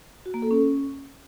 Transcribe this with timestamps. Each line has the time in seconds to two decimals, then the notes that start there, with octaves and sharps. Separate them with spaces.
0.26 F#4
0.34 A#3
0.42 A4
0.51 C#4